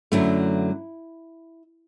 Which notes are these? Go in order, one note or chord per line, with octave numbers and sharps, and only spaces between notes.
F#2 D3 F#3 A3 E4